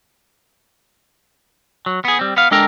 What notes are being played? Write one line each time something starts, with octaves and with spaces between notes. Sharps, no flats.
F#3
B3 G#4
G3 C4
B3 F5
G#3 D4 A4 A#4 G5 A#5